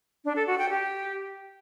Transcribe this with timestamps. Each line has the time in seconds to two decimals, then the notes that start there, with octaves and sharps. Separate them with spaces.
0.25 D4
0.36 A4
0.47 F#4
0.58 G5
0.69 G4